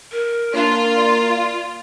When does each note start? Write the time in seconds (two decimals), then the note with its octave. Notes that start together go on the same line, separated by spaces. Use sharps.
0.12 A#4
0.55 A#3 D4 F4
0.94 D5